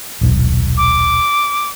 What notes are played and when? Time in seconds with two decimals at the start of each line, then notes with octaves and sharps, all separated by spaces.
0.21 D#1 B1
0.77 D6